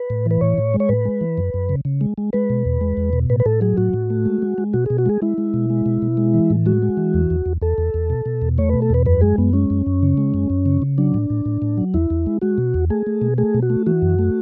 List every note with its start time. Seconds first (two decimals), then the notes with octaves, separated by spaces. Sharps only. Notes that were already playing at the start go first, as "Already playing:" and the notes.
Already playing: B4
0.10 A2
0.26 E3 B4
0.41 A2 C#5
0.58 A2
0.74 G#3
0.80 C#5
0.89 A2 B4
1.05 G#3
1.21 E3
1.38 F#2
1.54 F#2
1.69 C#3
1.85 C#3
2.01 G#3
2.18 G#3
2.33 G#3 B4
2.50 B2
2.65 E2
2.81 G#3
2.97 E2
3.13 B2
3.30 A2 B4
3.40 B4
3.46 A2 A4
3.61 F#3 G#4
3.77 A2 F#4
3.93 A2
4.10 A3
4.25 G#3
4.42 G#3
4.58 G#3
4.74 B2 F#4
4.86 B2 G#4
4.98 F#4
5.06 G#3 G#4
5.22 G#3 E4
5.38 G#3
5.54 B2
5.70 G#3
5.86 B2
6.02 B2
6.17 G#3
6.34 E3
6.50 A2
6.66 G#3 F#4
6.82 G#3
6.97 E3
7.14 E2
7.30 E2
7.46 E2
7.62 E2 A4
7.78 E2
7.94 E2
8.10 B2
8.26 B2
8.42 E2
8.58 A3 C#5
8.69 B2 B4
8.82 A4
8.90 E2 B4
9.06 F#2 B4
9.21 G#3 G#4
9.38 F#2 B3
9.53 G#3 C#4
9.70 F#2
9.86 F#2
10.03 C#3
10.17 G#3
10.34 F#2
10.50 F#2
10.66 C#3
10.82 C#3
10.98 F#3 D4
11.14 A2
11.30 A2
11.45 A2
11.62 A2
11.77 F#3
11.94 E2 E4
12.10 E2
12.26 G#3
12.42 G#3 F#4
12.58 B2
12.74 E2
12.90 A3 G#4
13.07 A3
13.22 B2
13.38 A3 G#4
13.54 B2
13.62 F#4
13.70 A3
13.86 E3 F#4
14.02 F#2
14.19 A3